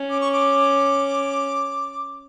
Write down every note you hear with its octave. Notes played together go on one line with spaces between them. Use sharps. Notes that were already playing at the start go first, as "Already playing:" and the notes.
Already playing: C#4
D6
C#6
D6